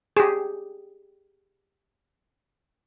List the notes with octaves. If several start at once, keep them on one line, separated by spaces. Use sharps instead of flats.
G4 G#4